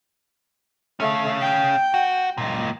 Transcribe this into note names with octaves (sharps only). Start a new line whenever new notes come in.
A3 C#4 F5
G5
F#4
C#2 A#2